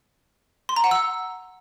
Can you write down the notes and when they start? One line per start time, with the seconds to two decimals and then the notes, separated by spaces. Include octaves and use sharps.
0.69 C6
0.76 A#5
0.84 F#5
0.91 E6